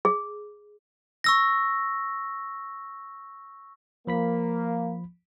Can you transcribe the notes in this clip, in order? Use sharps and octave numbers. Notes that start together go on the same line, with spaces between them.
G#4
C#6 E6 A#6
F3 A#3 B5 B6